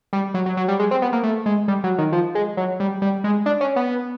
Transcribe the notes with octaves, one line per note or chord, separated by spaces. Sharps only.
G3
F#3
F#3
F#3
G3
G#3
C4
B3
A#3
A3
G#3
G3
F#3
D#3
F3
G#3
F#3
G3
G3
G#3
D4
C#4
B3